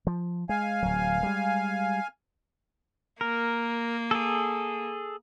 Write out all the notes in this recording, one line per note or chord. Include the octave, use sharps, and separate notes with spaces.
F3
G#3 F5 G#5
D1 F#3
G3 G#3
A#3 A#4
G#4 A4